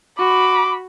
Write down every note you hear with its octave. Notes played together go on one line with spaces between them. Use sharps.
F#4 B5 D6